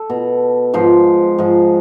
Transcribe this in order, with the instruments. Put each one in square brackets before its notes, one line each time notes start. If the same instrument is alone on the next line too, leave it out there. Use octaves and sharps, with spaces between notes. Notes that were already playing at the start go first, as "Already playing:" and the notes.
Already playing: [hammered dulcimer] A4
B2
G#2 F3 C5
G#2 F3